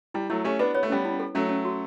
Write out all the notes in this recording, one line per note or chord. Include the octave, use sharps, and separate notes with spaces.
G3 E4
F#3 A3 E4
A3 C#4 G4
B3 D4 B4
B3 C#5
A3
G3 B3 C#4
E4
A4
F#3 A3 C#4
C#4
F#4